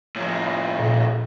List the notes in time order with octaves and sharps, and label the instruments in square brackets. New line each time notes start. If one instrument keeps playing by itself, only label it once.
[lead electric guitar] A2 F3
[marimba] A#2